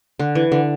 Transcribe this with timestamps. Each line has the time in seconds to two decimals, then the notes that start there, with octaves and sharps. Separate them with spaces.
0.19 D3
0.35 E3
0.52 D3